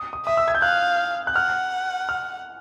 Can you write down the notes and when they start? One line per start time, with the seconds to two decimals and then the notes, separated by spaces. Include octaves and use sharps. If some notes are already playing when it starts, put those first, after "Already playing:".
Already playing: D#6
0.13 D#6
0.26 E5 D#6
0.37 E6
0.48 G#6
0.55 G6
0.62 F5 F#6
1.27 F#6
1.35 F#5 F6
2.09 F6